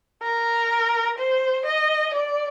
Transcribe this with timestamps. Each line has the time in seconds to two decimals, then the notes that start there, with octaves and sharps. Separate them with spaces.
0.22 A#4
1.18 C5
1.65 D#5
2.14 D5